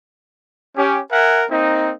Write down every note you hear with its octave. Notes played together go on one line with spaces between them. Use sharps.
C#4 G4
A#4 E5 F#5 G#5
A#3 C4 D#4